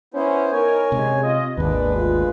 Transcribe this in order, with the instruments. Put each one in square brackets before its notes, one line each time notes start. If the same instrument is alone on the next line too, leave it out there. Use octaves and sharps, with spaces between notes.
[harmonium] B3 E4 C5 [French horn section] C#4
[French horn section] D#4 A#4 [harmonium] C#5 G#5
[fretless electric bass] C3 [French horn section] G#3 C#4
[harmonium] F4 [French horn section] D#5
[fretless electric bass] G#1 D#2 [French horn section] A#2 B3 D4 [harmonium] G#3 B4
[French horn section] D2 F4